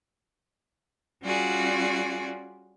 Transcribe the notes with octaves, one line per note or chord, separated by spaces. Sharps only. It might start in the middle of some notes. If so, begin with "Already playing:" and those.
G3 C#4 F4 F#4 G#4 D5